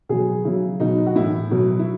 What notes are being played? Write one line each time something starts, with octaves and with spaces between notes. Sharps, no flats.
B2 F#3 G#4
C#3 F#3 E4
B2 F#3 D#4
F#4
A2 E3 E4
B2 F#3
E4